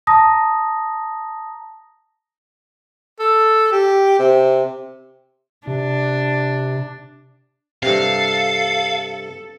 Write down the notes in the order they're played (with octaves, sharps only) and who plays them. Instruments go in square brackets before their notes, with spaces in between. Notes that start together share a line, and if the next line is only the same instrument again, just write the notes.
[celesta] A5 A#5 D#6 A#6
[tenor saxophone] A4
G4
C3
[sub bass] C3 [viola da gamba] D4
[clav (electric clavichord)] G2 C3 [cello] A4 [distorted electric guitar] F5